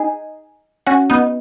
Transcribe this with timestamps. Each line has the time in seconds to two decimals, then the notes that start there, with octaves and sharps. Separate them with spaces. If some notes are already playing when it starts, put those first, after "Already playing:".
Already playing: D#4 G#4
0.86 C#4 F#4
1.10 B3 D#4